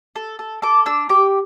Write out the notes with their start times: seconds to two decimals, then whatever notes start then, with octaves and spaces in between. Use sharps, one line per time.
0.16 A4
0.39 A4
0.62 A4 D6
0.86 D4 E6
1.09 G4 D6